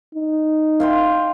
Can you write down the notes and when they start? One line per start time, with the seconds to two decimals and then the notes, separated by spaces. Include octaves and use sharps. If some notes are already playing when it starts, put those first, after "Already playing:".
0.15 D#4
0.80 F5 G5 C6